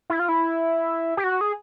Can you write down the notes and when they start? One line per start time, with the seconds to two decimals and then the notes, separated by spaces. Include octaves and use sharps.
0.10 E4
0.19 F4
0.29 E4
1.17 G4
1.24 F#4
1.41 G#4